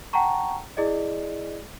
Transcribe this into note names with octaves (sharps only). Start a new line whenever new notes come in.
F#5 G5 A5 A#5 C#6
E4 G#4 D5 D#5